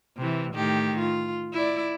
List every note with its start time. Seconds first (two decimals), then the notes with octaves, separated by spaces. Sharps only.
0.17 C3 E3
0.54 A2 D#3 G4
0.99 F4
1.53 E4 D5